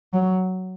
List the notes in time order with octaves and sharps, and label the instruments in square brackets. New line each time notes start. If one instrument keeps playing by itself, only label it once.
[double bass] F#3